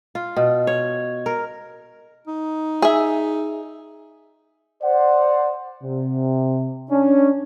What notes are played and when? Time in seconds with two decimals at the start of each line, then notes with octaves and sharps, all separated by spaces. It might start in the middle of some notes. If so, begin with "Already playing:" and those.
0.15 F4
0.36 B2
0.67 C#5
1.26 A#4
2.28 D#4
2.82 G#4 E5
4.83 C5 D5 F#5
5.84 C3
6.90 C#4 D4